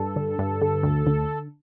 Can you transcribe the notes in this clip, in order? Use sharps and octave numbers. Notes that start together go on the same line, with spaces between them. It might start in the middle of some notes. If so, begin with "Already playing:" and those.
Already playing: G2 A4
D3
G2
D3
D2
D3